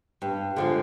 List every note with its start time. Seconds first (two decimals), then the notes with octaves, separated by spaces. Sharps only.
0.22 G2
0.56 D3 F3 G#3